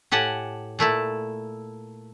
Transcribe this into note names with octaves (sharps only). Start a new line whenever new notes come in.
A2 G4 F#5 G#5 A5
A#2 A3 E4 A5